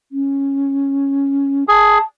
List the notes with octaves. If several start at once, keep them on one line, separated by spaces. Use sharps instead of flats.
C#4
G#4 A5